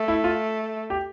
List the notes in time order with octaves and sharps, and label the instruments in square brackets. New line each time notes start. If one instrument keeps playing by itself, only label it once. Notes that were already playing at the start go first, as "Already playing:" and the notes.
Already playing: [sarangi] A3
[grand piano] E4
F4
G4